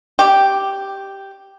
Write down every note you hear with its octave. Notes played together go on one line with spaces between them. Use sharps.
G4